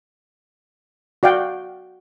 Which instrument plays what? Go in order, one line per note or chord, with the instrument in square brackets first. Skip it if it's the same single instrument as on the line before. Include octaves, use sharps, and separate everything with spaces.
[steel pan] F#4 D5 F5 G5